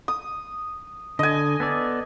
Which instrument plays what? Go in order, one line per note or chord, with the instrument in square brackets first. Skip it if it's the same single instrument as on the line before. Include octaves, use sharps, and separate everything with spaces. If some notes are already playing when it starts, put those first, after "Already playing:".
[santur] D#6
[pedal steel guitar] D3 [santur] D#5 G#5
[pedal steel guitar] B3 A4 D5